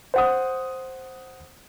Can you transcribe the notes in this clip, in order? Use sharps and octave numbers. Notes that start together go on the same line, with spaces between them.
C5 F#5 D#6